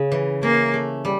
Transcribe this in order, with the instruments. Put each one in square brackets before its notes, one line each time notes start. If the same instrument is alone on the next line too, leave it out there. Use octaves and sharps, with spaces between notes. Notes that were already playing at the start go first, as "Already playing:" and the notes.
Already playing: [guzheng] C#3 C#4
E3
[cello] A#3 [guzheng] C#4
[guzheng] A3
G3